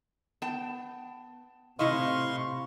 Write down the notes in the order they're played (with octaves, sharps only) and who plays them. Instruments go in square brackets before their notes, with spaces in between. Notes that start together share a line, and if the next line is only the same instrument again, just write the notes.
[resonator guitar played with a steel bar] B3 G5 A5
[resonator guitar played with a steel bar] A2 E4 D#5 [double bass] C3 [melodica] F5 C6 C#6